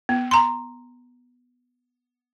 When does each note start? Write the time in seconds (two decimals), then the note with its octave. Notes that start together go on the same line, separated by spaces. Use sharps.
0.09 B3
0.31 A#5 C6